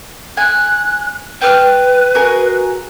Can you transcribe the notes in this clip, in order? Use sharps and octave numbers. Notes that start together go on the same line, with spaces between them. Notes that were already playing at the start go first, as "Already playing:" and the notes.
G#5 F#6
B4 G5 F6
F#4 G#4 A#4